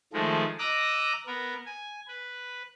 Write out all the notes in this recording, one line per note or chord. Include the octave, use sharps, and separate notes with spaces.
D#3 F3 G#3 A3
D#5 A#5 D6 E6 F#6
B3 A#4
G#5
B4